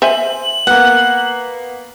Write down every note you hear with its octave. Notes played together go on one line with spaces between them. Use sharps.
C5 E5 G#5 F#7
A#3 B3 F#5